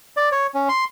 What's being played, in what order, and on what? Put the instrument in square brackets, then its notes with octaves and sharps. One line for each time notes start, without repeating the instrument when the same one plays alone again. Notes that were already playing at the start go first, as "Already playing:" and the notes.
[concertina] D5
C#5
C#4
C6